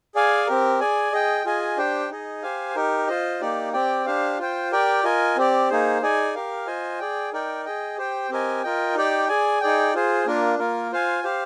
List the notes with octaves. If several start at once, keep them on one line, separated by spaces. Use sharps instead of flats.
G#4 D5 F5 G#5
C4 G4 A#4
G#4 D5 G#5
G#4 D#5 G5
F4 G#4 D#5 G#5
D4 G4 C5 G5
D#4 G#4 D#5
G4 C5 F5 G#5
D#4 G4 A#4
F4 C5 D#5
A#3 D#4 G4 D5
C4 G4 D5 G5
D4 G4 C5 F5
F4 C5 G5
G4 A#4 D5 G5
F4 A#4 D#5 G#5
C4 G4 D5
A#3 D#4 G#4 C5
D#4 G#4 D5 G#5
G4 A#4 F5
F4 C5 D#5 G#5
G#4 D5 G5
D#4 A#4 D5 G5
G#4 D#5 G5
G4 C5 G5
C4 G4 A#4 D#5 G#5
F4 A#4 D#5 G5
D#4 G4 D5 G5
G#4 D5 G#5
D#4 G#4 D5 G5
F4 G#4 C5
A#3 D4 F4 A#4
A#3 F4 A#4
F4 C5 F5 G#5
G4 C5 F5